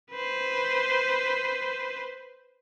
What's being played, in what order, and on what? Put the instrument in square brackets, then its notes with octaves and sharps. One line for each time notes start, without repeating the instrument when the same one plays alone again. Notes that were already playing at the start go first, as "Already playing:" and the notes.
[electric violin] B4 C5